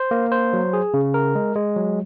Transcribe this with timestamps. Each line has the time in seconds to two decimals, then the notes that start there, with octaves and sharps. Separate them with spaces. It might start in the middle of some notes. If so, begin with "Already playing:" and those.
Already playing: C5
0.11 A#3
0.32 C5
0.53 F#3
0.73 G#4
0.94 C#3
1.14 A#4
1.35 G#3
1.56 G#3
1.76 F#3